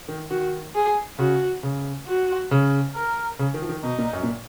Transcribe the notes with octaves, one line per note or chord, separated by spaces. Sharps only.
D#3
D#3 F#4
G#4
C#3 F#4
C#3
F#4
C#3
A#4
C#3
D#3
F3
D#3
B2 D#4
A#2
F#2
A#2